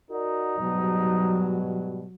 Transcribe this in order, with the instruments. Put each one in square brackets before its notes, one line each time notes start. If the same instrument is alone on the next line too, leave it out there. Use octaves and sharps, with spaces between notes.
[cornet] D#4 [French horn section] F#4 A#4 D5
[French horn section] G#2 B2 G3 [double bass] F#3